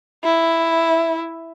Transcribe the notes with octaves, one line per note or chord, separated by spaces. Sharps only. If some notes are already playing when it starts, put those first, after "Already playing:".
E4